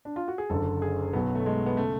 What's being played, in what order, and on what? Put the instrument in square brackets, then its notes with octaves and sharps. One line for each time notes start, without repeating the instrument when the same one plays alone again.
[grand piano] D4
F4
F#4
G#4
F#1 F#2 D3 A4
G#4
B1 B2 F#3 B3
A3
G#3
B3
C#3 A3